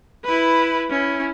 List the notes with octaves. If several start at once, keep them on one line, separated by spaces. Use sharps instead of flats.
E4 B4
C#4 E4